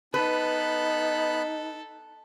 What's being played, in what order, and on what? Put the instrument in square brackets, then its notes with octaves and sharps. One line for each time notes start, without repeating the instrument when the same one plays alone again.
[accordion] B3 B5 F#6 [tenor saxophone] D#4 [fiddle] A4 [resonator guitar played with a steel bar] B4